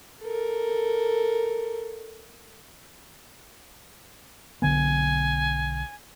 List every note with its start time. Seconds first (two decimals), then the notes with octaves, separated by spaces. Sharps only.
0.22 A4 A#4
4.62 B1 D3 B3 G#5